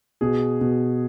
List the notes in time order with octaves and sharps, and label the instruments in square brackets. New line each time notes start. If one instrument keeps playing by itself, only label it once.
[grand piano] B2 G#4
B2